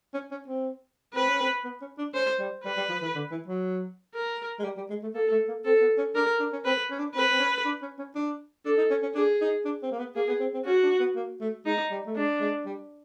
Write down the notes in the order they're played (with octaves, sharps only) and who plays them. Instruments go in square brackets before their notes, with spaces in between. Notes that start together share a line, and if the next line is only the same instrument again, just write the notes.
[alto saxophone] C#4
C#4
C4
[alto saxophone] C4 [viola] B4
[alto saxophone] C#4
C4
B3
C#4
D4
[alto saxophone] C#4 [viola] C5
[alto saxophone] G3
[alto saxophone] G3 [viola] B4
[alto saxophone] G3
F3
E3
D3
E3
F#3
[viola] A#4
[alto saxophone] G#3
G3
G3
G#3
A3
[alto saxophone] A#3 [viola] A4
[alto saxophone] A3
A#3
[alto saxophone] C4 [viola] A4
[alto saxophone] B3
C#4
[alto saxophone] D4 [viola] A#4
[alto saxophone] D4
C#4
[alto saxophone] C4 [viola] B4
[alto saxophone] C#4
D4
[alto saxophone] C4 [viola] B4
[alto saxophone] C4
C#4
D4
C#4
C#4
D4
[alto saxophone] D4 [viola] A4
[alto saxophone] D#4
C#4
C#4
[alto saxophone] D4 [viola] G#4
[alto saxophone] D#4
D4
C4
A#3
B3
[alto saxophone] A#3 [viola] G#4
[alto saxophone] B3
C4
C4
[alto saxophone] C#4 [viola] F#4
[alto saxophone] D4
B3
A#3
A3
[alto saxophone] G#3 [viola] D#4
[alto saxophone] G3
A3
[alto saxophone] G#3 [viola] D4
[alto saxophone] G#3
G3